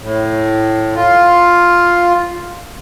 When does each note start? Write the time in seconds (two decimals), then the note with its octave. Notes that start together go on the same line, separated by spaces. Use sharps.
0.01 A2
0.95 F4